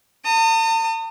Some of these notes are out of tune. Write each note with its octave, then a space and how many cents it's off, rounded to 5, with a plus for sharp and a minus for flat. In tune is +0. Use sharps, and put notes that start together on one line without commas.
A5 +45 D#6 -10